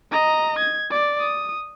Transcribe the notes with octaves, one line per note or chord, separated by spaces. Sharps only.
D#5 A#5
G#6
D5
D#6